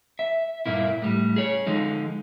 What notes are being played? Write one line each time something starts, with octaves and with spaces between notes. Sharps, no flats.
E5
G2 A#2 A#3 E4
A2 G3
G#4 C#5
D3 F3 G#3 D#4